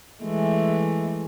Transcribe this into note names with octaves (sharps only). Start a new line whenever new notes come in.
E3 G#3 A3